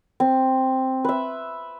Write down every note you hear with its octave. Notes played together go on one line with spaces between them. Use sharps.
C4
B4 E5